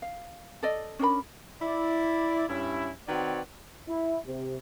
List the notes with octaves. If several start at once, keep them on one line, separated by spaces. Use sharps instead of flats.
F5
A4 D5 D#5
C#4 D4 A#4 B5
E4 D5
G2 C#4 E4
D#3 C4 F#4 B4 C#5 D5
E4
C3